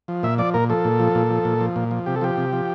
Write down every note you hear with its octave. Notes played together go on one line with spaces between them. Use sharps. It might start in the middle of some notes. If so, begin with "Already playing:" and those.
F3
A#2 E5
F3 D5
A#2 A#4
F3 A4
A#2
F3
A#2
F3
A#2
F3
A#2
F3
C3 G4
A4
F3 G4
C3
F3